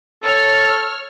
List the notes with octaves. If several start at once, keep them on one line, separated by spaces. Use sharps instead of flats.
A4 C#5 F6